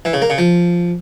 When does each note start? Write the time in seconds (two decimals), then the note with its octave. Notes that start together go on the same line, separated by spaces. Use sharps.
0.05 E3
0.13 C#3
0.22 A#3
0.30 C#3
0.38 F3